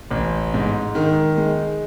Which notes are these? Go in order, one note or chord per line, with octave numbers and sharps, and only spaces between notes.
A1
G#2
D#3
G#3